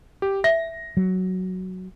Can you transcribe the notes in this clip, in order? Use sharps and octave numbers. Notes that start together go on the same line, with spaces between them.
G4
E5 A#6
F#3